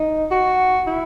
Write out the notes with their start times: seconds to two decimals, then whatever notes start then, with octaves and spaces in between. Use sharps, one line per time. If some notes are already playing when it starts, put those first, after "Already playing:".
Already playing: D#4
0.31 F#4
0.87 E4